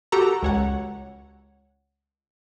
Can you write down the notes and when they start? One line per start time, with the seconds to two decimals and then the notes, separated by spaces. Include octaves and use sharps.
0.12 F#4 G4 A4 A#5
0.43 C#2 C#5 F#5